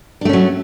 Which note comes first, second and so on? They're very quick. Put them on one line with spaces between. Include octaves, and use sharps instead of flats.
D4 A3 C#4 F#3